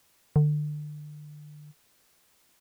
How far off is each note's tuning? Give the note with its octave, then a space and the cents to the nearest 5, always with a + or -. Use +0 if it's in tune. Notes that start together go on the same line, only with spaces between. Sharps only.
D3 +30